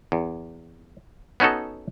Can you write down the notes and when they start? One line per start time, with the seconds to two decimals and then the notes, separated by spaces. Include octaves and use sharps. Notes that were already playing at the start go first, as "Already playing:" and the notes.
0.12 E2
1.40 B3 C#4 D#4 F#4 A4